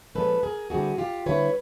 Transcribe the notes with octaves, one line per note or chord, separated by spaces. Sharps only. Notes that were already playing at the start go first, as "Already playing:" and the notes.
A#2 F3 G#3 C#4 A4 B4
G#4 A#4
D3 G3 C4 E4 F#4 G#4
F4 G4
D3 G3 C4 E4 B4 C#5